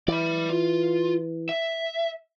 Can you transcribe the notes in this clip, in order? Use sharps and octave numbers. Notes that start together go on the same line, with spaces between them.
E3 D5 B5
F4
E5